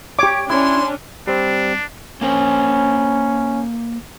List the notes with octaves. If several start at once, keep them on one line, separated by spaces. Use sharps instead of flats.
G4 C#5 D6
C#4 D4 E4 C6
G3 C4 D4
A#3 C#4 A#4 C5